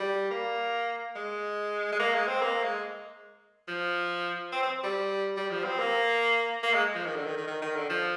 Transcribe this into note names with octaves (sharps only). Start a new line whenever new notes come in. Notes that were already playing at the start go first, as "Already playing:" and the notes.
Already playing: G3
A#3
G#3
G#3
A#3
G#3
C4
A#3
G#3
F3
C4
C4
G3
G3
F3
C4
A#3
A#3
G#3
F3
D#3
D3
D#3
D#3
D#3
D#3
D3
F3